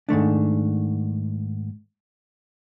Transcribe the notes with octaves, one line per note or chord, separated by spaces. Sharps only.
G#2 D#3 A3 D4